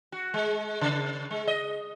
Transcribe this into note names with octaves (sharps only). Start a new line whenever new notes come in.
F#4
G#3
C#3
G#3
D#5